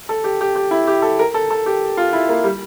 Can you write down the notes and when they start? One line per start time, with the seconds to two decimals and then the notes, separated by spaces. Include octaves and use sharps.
0.09 A4
0.24 G4
0.41 G4
0.56 G4
0.71 E4
0.87 G4
1.02 A4
1.19 A#4
1.34 A4
1.51 A4
1.66 G4
1.97 F4
2.13 E4
2.29 A#3
2.44 G3